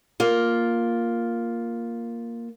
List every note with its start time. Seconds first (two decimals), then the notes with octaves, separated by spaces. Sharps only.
0.20 A#3 F4